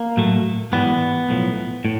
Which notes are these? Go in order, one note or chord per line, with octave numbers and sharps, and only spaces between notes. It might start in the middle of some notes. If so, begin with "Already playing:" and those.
Already playing: A#3
A2 F#3 A3
G#2 E3 G3 B3
B1 A2 F3
A2